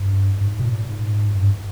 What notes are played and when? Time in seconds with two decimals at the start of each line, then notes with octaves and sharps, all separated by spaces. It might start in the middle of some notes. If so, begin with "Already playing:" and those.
Already playing: G2
0.41 G#2
0.59 B2
0.64 A#2
0.87 G#2
1.35 G2